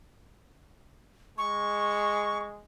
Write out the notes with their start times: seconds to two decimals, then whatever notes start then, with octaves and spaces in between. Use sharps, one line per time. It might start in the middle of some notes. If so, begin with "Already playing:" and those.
1.38 G#3 C#6